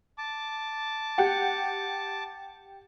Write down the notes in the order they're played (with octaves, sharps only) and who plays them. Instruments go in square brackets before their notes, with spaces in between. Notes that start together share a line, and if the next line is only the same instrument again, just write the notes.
[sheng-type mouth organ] A5 D6
[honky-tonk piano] G4 F#5